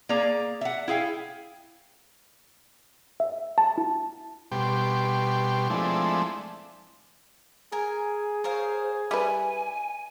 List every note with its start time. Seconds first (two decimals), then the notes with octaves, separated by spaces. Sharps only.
0.09 A#3 G#4 D5 A#5
0.61 E5 F#5
0.88 E4 G#4 F5 G5
3.20 E5
3.58 A5
3.78 E4
4.52 B2 G3 G4 C6
5.70 F3 G#3 A3 C4 D4 E4
7.72 G#4 A#4 G#5
8.44 A#4 C5 C#5 F5
9.11 G3 E4 B4 G#5